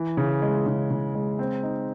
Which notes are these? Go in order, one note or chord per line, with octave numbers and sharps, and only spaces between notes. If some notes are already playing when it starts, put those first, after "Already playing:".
Already playing: E3
C#3
G#3
C#3
C#3
G#3
C4
D#4